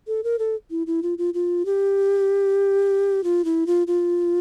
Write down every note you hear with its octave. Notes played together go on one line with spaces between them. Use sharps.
A4
A#4
A4
E4
E4
F4
F4
F4
G4
F4
E4
F4
F4